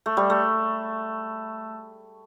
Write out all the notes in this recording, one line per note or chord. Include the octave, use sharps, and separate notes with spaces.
A3
G3
A3